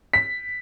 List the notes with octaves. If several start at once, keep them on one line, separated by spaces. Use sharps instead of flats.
B6